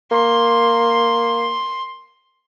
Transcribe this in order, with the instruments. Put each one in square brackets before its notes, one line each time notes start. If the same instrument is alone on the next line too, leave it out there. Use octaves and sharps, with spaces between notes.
[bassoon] A#3 [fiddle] C6